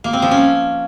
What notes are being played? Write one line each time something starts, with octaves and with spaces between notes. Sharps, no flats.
A#3
C4
F3
C#4